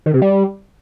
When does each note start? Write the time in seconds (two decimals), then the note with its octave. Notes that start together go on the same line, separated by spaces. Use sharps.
0.06 D#3
0.14 C3
0.22 G3